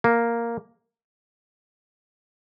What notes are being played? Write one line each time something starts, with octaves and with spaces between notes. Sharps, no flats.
A#3